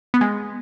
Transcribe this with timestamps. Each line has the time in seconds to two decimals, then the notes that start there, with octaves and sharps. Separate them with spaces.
0.14 B3
0.21 G#3